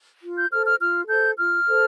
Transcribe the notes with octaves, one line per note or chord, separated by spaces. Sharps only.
F4
G6
A4 C5 F6
F6
F4 F6
A4 C5 G6
F4 F6
A4 C5